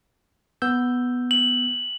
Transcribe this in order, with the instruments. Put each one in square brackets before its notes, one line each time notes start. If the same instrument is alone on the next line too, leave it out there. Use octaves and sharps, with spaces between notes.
[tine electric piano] B3 E6 G6
[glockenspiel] F#7